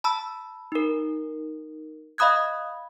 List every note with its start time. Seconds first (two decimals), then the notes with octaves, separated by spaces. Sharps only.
0.04 A5 B5 E6
0.72 D#4 A#4
2.18 D#5 F5 B5 D#6 F#6 G#6